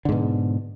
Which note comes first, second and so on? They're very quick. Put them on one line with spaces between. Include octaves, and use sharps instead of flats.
D3 G#2 B2